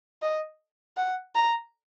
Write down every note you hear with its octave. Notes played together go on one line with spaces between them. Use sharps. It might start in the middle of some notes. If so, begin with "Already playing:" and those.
D#5
F#5
A#5